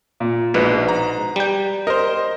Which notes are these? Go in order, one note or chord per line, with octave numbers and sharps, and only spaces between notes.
A#2
A#1 G#2 B2 B4
A#5
G3 G5
A#4 C5 D#5